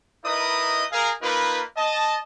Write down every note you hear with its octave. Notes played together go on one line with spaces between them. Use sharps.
D#4 E4 A#4 B4 D#5 D#6
G#4 A#4 F5
A#3 D#4 F4 A#4 B4
D#5 A5